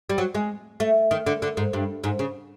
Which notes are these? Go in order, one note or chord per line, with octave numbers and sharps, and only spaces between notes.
G3
F#3
G#3
A3
D#3
D3
D3
G#2
G2
G#2
C#3